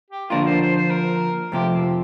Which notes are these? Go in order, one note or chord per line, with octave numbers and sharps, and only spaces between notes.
G4
D3 F3 A#3 D4 F4 A#4
C5
C5
C5
A#4
F2 C3 F3 G4
C4